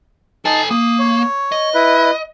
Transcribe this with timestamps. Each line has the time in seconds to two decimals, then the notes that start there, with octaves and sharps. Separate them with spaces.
0.45 D#4 A4 G#5 A5
0.71 A#3 D#6
0.99 C#5
1.52 D#5
1.74 E4 B4